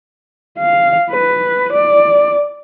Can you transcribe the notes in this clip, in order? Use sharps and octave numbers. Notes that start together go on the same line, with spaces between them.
F5
B4
D5